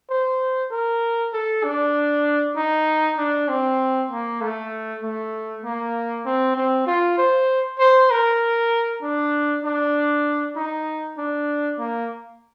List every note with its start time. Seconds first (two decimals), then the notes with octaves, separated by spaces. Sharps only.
0.10 C5
0.72 A#4
1.33 A4
1.64 D4
2.57 D#4
3.18 D4
3.49 C4
4.10 A#3
4.41 A3
5.02 A3
5.65 A#3
6.26 C4
6.56 C4
6.87 F4
7.18 C5
7.79 C5
8.11 A#4
9.03 D4
9.64 D4
10.56 D#4
11.18 D4
11.79 A#3